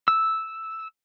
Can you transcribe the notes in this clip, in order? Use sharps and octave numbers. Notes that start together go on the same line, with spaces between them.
E6